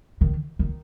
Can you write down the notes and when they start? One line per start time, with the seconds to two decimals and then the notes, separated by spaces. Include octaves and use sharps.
0.21 D#3
0.59 D#3